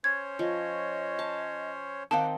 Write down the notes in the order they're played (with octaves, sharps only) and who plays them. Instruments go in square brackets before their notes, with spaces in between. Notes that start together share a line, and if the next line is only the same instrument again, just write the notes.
[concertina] C#4 C5 C#5 [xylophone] G#6
[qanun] F3 [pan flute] D#5
[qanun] A5
[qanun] D#3 C4 D#4 [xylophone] F5 A5 [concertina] F#5 D6